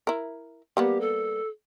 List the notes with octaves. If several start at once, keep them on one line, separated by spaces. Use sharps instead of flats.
E4 A#4
G3 A#3 B3 G4
A4